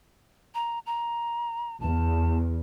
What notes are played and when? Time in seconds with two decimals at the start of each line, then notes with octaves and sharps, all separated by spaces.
0.55 A#5
0.86 A#5
1.80 E2 A5